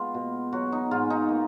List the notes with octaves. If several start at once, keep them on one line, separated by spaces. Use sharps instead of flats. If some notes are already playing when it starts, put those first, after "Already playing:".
Already playing: G#3 B3 F4
B2
F#3 F#4
D#4
G#2 F4
D#4
A#3